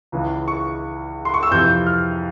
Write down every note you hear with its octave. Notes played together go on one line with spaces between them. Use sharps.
C#2 C#3 E3
C#6
C6
C#6
E6
F2 C3 E3 G6
F6